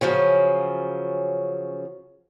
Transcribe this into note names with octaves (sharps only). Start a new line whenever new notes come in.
C#3 F3 F#3 C#4